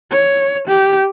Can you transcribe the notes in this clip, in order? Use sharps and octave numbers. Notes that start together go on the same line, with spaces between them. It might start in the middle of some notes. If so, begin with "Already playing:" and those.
C#5
G4